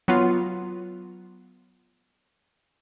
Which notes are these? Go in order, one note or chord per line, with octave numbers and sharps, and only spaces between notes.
F#3 B3 F4